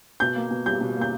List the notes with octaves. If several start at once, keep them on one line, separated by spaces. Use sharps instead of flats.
B2 G6
A#3
B2
G3 G6
B2
A#3 G6